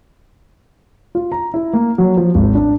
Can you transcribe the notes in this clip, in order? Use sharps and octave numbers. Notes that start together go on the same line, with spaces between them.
F4
A#5
E4
A#3
F#3
F3
G#1
D4